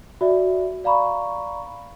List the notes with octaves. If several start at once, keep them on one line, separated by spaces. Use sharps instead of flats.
F#4 D5 E5
D5 F5 A#5 B5 C#6